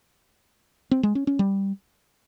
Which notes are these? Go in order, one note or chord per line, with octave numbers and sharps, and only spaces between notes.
C4
G#3
C#4
C#4
G3